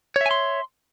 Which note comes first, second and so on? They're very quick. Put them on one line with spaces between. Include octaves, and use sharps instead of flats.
C#5 E5 G#5 C6